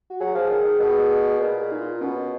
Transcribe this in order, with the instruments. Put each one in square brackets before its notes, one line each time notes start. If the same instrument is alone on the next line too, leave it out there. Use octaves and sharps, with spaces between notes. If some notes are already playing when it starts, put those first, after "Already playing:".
[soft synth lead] F#4
[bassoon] F#3 [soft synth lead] G#4
[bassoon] F3
D#3
D#3
B2
[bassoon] A#2 [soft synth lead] G#4
[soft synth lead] G#4
D#4
F4
[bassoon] B2 [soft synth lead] C#4